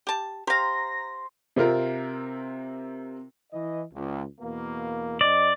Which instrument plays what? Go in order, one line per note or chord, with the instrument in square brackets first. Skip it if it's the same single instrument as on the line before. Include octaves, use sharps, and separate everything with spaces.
[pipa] G4 A5
[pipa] G4 F5 [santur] C5 [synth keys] A#5 A#6
[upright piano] C3 C4 F4 A#4
[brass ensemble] E3 D#5
C#2
E2 B2 A#3
[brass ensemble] F#2 C5 D#5 [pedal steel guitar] D5